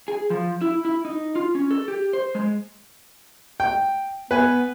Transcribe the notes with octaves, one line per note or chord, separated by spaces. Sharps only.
G#4
F3
E4
E4
D#4
F4
C#4
A4
G4
C5
G#3
G5
B3 B4 G#5